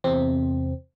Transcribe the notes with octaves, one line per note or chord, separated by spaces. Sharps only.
E2 C3 C4